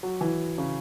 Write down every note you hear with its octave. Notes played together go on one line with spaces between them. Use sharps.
F#3
E3
C#3